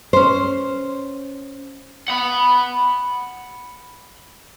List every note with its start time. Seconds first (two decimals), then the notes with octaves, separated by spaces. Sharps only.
0.13 C#4 C5
2.08 F#5 B5